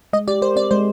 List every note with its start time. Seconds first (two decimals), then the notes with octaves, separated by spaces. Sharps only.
0.13 G#3 D#5
0.28 G4 D5
0.42 A#4 C5
0.56 C4 D5
0.71 G#3 C5